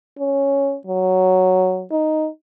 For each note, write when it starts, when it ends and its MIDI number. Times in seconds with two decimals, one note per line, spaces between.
0.19 0.76 61
0.87 1.84 54
1.91 2.28 63